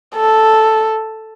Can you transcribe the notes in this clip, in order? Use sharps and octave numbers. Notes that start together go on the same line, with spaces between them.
A4